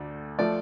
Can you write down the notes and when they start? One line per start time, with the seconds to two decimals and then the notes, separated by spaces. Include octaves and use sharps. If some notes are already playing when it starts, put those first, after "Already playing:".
Already playing: D2 D3 A3
0.39 F3 A3 D5